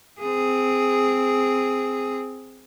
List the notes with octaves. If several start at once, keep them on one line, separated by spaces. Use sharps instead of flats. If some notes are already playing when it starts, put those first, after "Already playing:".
C4 G#4